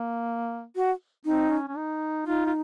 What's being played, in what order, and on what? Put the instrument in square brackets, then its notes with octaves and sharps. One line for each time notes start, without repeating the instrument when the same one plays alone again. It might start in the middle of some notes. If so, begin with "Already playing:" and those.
Already playing: [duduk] A#3
[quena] F#4
[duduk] C4 [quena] D#4
[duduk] C#4
C#4
D#4
[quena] D#4 [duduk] F4
[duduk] F4